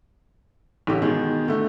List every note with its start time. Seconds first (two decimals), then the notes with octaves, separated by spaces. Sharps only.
0.87 A1 D3 G4
1.02 B2 D#3 G#3
1.48 D3 A3